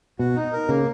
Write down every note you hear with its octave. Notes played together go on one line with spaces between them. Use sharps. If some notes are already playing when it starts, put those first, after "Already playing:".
B2 F#4
D#4
A#4
C#3 A#3